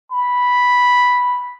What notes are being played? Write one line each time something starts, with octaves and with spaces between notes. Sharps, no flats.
B5